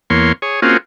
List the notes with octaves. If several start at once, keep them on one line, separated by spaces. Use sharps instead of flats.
E2 A#3 C#5 C6
G#4 C#5
A#3 C4 C#4 F4 F#4 G#4